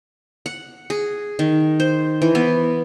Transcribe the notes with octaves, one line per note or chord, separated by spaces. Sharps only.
F#5
G#4
D#3
C5
E3
B3